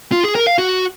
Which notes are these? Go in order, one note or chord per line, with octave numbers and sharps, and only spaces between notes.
F4
G#4
A#4
F5
F#4